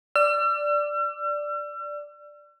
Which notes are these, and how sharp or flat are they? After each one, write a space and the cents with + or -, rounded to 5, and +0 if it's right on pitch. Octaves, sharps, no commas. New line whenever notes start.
D5 +0 E6 +45